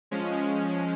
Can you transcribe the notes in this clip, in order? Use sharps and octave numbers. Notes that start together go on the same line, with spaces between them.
F3 G#3 C#4